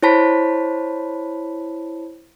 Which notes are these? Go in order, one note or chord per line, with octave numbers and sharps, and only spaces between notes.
E4 C5 C#5 A5 B5 B6